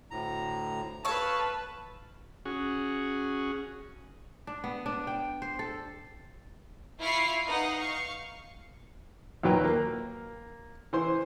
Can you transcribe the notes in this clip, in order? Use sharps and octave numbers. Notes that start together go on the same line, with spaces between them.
D2 A2 A#5
B4 C#5 F5 A5 E6
C#4 F#4 G#4
D4
B3
D4
G5
C5
A4
E4 F4 B5 C#6 F6 C7
D#4 B4 F5 F#5
F5 C#6
D#2 A#2 F#3 B4 G5 A#5
A#3
E3 C5 C6